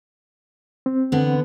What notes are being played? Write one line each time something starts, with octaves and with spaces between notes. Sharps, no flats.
C4
D3 B3